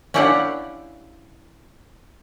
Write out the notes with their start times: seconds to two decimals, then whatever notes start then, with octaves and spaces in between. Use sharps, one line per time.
0.14 C#4 D4 E4 G4 F5 F#5